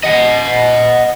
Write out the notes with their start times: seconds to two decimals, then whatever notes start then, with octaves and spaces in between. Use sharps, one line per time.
0.03 D#5 F#5